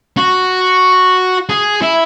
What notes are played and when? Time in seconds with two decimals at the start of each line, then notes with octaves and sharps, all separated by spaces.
0.17 F#4
1.49 G#4
1.82 E4